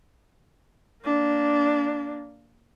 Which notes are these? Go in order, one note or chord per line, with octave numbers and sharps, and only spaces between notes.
A#3 D4